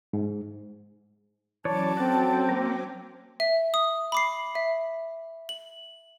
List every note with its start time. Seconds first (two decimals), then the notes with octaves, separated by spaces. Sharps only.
0.13 G#2
1.65 E3 F#3 C#4 C#5 D5 A5 D6
1.97 C4 F#4 A4
2.49 A#3 A#4
3.40 E5
3.74 D#6
4.12 B5 D6 C7
4.55 E5
5.49 F#7